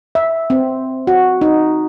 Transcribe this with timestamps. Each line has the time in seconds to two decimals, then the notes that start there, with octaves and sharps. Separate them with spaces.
0.15 E5
0.50 C4
1.07 F#4
1.41 D#4